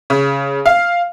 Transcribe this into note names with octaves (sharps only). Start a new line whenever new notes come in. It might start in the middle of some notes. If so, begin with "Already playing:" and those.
C#3
F5